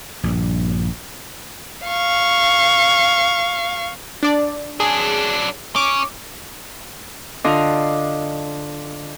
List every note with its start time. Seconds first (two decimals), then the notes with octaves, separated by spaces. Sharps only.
0.23 A#1 G2
1.87 F5 C#6
4.23 D4 D5
4.80 F#3 D4 G#4
5.76 C#4 D6
7.44 D3 D4 F4 D#5 F5